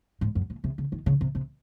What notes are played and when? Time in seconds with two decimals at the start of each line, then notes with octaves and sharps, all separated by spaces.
0.21 G#2
0.35 F#2
0.50 A#2
0.64 C3
0.78 C#3
0.92 D#3
1.06 C#3
1.21 C3
1.35 C3